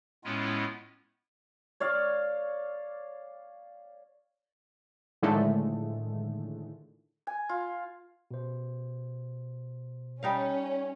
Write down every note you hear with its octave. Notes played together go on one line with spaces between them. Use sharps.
A2 G#3 B3 C#4 E4 F4
C#5 D5 F5
A2 D3 D#3 F3 G#3 A3
G#5
F4
B2 C5
G3 C#4 D#4 F5